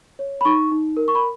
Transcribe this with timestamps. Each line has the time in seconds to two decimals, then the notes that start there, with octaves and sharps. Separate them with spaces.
0.19 C#5
0.41 B5
0.45 D#4 C#6
0.72 D#4
0.97 A#4
1.08 C#6
1.15 B5